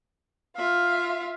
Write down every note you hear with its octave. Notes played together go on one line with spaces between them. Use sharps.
F4 E5 F5